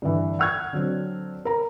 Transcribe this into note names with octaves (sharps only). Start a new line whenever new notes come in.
G2 D3 E3
F#5 C#6 F6 F#6 G#6
D3 F#3 C4
A#4 A#5